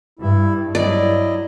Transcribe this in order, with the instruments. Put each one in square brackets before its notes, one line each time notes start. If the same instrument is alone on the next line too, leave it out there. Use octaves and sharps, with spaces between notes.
[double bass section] G2 [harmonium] E4
[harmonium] F#3 E4 D#5 [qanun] D5